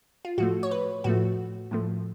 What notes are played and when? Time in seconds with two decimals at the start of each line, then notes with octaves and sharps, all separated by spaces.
0.25 F4
0.38 A2 F3 A3 F#4
0.63 C#5
0.71 B4
1.04 A2 F3 A3 F#4
1.71 A2 F3 A3